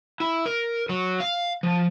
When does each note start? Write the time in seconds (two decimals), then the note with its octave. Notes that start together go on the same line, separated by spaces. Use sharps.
0.20 E4
0.46 A#4
0.89 F#3
1.20 F5
1.63 F3